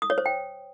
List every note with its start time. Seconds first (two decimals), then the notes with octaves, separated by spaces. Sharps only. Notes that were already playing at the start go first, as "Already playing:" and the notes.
0.02 D#6
0.10 C#5
0.18 C5
0.26 G5